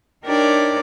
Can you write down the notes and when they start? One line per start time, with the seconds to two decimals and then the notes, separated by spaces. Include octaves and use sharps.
0.24 D4 D#4 G4 A#4 C#5 D5